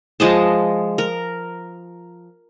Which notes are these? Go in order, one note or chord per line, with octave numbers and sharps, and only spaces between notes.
F3 G#3 D#5 A5
A#4